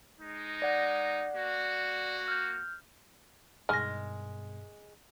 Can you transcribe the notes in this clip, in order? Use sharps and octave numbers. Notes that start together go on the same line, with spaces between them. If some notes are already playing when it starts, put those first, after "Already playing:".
G#3 D#4
D5 F#5
A#3 F#4
F6 G6
G2 B2 D#3 G#3 G#4 F6 A#6